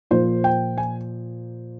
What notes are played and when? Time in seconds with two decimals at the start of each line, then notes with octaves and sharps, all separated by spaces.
0.11 A#2 F3 A#3 F4 C5
0.44 G5
0.78 G#5